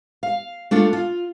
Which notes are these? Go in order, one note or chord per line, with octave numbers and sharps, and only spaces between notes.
F5
A3 D4 F4 A4
F4